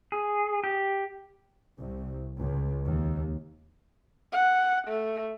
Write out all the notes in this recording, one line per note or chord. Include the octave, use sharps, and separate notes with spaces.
G#4
G4
C2
C#2
D#2
F#5
A3